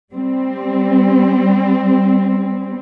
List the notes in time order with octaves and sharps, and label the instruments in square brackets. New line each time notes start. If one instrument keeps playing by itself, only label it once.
[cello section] G3 C4